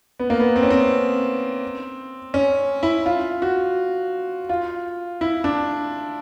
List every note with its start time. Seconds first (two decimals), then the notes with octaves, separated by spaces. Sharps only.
0.20 B3
0.30 A#3
0.40 B3
0.56 C4
0.63 C#4
0.71 C4
2.34 C#4
2.83 E4
3.06 F4
3.42 F#4
4.49 F4
5.21 E4
5.44 D4